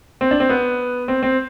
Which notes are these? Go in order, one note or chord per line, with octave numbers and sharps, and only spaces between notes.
C4
D4
C4
B3
C4
C4